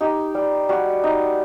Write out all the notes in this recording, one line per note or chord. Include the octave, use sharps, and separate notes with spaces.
D#4 G4
G3
G3 F#4
D#4